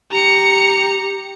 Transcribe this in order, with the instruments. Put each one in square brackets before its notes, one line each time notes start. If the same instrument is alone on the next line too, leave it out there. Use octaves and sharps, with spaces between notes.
[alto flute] G4 [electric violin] A#5 C#7